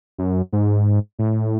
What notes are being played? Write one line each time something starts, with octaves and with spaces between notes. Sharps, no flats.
F#2
G#2
A2